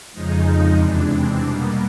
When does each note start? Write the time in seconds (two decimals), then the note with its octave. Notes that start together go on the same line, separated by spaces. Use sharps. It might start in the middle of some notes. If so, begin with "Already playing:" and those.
0.12 F2 C#3 F3 G#3 D#4
0.76 E2 C3 E3 G#3 D4
1.08 C4
1.39 B2 G3 A#3 B3